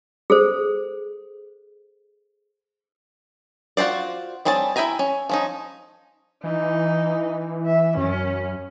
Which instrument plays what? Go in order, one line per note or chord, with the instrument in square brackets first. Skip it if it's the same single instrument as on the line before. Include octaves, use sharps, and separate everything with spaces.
[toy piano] G#4 A4 C5
[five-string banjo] F4 F#4 A4 C5 D5
G3 C4 G#4 C#5 A5
E4 E5 G5 G#5 A#5
C#4
F3 C#4 D#4
[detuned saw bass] E3 [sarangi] D#4
[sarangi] E5
[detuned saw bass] F#2 [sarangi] C#4